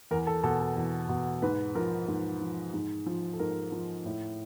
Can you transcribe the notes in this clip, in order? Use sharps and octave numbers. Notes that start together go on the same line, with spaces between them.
E2 A#4
A4
B2 A4
A4
E2
B2
G#2 B4
F3 A#4
G#2
F3
G#2
F3
A4
G#2 A#4
F3
A2